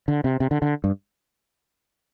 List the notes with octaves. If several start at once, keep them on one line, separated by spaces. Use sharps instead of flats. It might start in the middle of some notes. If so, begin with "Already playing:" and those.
D3
C3
C3
D3
D3
G2